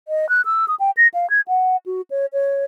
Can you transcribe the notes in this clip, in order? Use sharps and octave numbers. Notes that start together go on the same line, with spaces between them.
D#5
F#6
E6
D#6
G5
A#6
F5
G#6
F#5
F#4
C#5
C#5